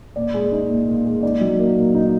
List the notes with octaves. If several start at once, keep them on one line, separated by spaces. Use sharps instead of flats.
A#2 D5
G#3
D#4
A#2
A#2
G#3
D#4 D5
F#3
A#3
A#2
D#4